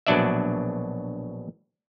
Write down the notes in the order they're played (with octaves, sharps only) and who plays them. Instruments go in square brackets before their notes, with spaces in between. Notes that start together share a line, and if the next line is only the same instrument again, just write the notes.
[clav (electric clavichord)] A#1 B2 F#3 D4 D5 E5